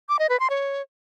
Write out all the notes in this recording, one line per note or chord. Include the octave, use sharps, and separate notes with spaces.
D6
D#5
B4
C6
C#5